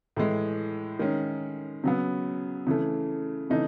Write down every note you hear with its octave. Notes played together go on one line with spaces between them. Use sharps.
A2 E3 G#3
D#3 G#3 C#4
C#3 F#3 B3
C#3 E3 A3
C#3 E3 A3 D#4